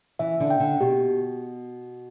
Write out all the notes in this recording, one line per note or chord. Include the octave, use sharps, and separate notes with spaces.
E3 E5
D3
G5
D3
B2 G4